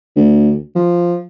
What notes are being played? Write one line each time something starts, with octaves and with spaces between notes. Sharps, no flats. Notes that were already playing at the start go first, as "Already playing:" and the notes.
D2
F3